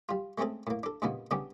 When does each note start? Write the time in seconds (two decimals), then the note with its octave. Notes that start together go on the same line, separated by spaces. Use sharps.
0.09 G3 F4
0.38 G#3 A3 C4 C#4 G#4 A4
0.67 A2 A#3
0.83 D4 A4
1.02 G2 A#2 C#3 A#3 B3 D#4
1.31 C#3 G3 B3 C#4 D4 G4